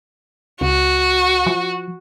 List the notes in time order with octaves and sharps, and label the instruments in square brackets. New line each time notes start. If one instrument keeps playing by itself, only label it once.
[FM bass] C#2 [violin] F#4
[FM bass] F3